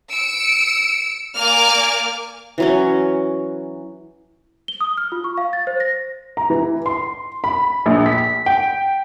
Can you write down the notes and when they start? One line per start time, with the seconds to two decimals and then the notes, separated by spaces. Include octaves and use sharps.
0.10 E6 C#7 D7
1.36 A#3 D5 G#5 D6 F6
2.58 E3 F#3 C#4
4.68 G7
4.81 D#6
4.97 F6
5.12 F4
5.24 C#6
5.37 F5
5.53 A6
5.67 C5
5.80 A#6
6.37 A#5
6.50 E3
6.86 C6
7.44 B5
7.86 A#1
8.06 B6
8.46 G5